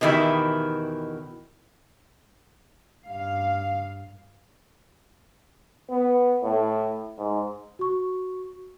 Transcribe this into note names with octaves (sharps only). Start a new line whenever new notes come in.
E2 B2 D#3 E4 G4
G2 F5
B3
A2
G#2
F#4 C#6